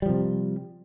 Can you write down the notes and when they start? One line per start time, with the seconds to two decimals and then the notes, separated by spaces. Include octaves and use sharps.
0.02 G3
0.06 F3
0.09 C3